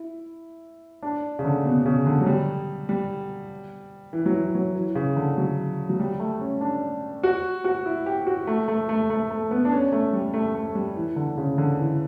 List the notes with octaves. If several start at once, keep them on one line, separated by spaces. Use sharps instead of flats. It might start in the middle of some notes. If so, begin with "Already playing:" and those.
Already playing: E4
D4
C#3
D3
B2
B2
C#3
D3
F#3
G3
G3
E3
F#3
E3
F#3
E3
C#3
D3
F#3
F#3
G3
A3
C#4
D4
F#4
F#4
E4
G4
F#4
A3
A3
A3
A3
A3
B3
D4
C#4
A3
G3
A3
A3
G3
E3
D3
C#3
D3
E3